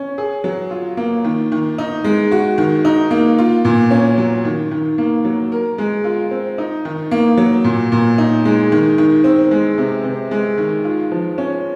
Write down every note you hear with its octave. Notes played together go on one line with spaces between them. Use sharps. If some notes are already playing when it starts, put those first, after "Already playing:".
Already playing: C#4
G#4
F#3
F4
A#3
D#3
D#3
D#4
G#3
F#4
D#3
D#4
A#3
F4
A#2
C#4
F#3
D#3
D#3
A#3
F#3
A#4
G#3
F4
C4
D#4
D#3
A#3
F#3
A#2
A#2
D#4
G#3
D#3
D#3
C4
G#3
C3
C3
G#3
D#3
F4
F3
C#4